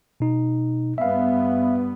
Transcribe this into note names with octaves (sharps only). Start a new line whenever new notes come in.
B2 D#4
G2 B3 E5 F5